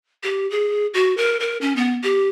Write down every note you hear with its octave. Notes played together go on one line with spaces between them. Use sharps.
G4
G#4
F#4
A#4
A#4
C#4
B3
G4